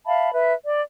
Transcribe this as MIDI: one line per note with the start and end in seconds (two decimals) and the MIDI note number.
0.06 0.30 76
0.06 0.30 77
0.06 0.30 81
0.06 0.30 83
0.32 0.53 71
0.32 0.53 76
0.64 0.81 74